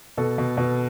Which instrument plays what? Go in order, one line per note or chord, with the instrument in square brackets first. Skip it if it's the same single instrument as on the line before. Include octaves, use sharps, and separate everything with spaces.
[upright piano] B2 A4
B2
B2